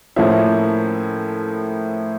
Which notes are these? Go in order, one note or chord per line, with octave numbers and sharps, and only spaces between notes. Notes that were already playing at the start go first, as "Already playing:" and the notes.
A2 F3 A#3 C#4 E4